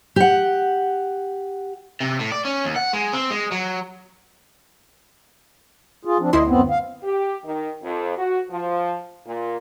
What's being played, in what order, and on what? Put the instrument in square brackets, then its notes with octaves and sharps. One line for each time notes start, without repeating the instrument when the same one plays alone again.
[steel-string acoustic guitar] G4 F#5
[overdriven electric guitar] C3
A2
D5
C#4
D#2
F#5
G#3
C4
G#3
F#3
[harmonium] F4 G#4
F3 C4 D4
[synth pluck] D2 E4 C6 [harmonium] D#5
[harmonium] F#2 B3 C4
F5
[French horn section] G4
D#3
F2
F#4
F3
A#2